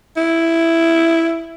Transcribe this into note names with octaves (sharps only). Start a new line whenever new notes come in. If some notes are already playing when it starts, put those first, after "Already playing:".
E4